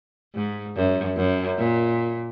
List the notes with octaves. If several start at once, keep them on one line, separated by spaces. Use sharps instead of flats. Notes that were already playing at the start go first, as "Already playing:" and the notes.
G#2
F#2
F#2
A#2